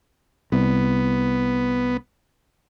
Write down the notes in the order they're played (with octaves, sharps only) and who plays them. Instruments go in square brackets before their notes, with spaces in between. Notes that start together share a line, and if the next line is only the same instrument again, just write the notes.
[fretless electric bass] C2 [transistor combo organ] B3